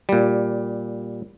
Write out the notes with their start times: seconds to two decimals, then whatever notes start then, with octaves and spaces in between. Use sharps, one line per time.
0.09 A#2 G3